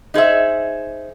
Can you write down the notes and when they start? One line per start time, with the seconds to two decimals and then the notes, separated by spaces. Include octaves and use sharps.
0.14 D#4 G#4 C5 E5